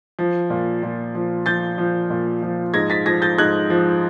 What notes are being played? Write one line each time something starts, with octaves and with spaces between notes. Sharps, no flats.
F3
A#2
A#2
F3
F3 G6 A6
F3
A#2
F3
G#2 G#6 A#6
A6 B6
F3 G#6 A#6
G6 A6
G#2 F#6 G#6
F3